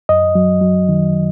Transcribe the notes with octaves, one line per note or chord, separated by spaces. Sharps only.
F#2 D#5
F#3
F#3
D#3